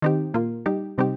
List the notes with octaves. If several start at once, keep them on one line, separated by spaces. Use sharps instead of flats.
D#3 C4 D#4 G4
A#2 A#3 F4
G3 D#4 G4
C3 G3 C4 D#4 G4